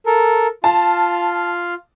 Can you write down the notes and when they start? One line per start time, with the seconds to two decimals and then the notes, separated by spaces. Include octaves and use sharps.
0.06 A4 A#4
0.64 F4 F5 A5